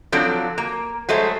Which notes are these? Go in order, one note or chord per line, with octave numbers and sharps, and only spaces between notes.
F3 F#3 C4 D4 A4
A#3
F#3 G#3 A3 C5